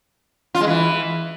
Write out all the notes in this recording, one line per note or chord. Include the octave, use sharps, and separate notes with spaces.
F4
G#3
E3